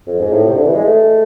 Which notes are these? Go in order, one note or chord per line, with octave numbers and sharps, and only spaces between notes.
F2
G#2
A2
C3
D3
E3
G#3
A3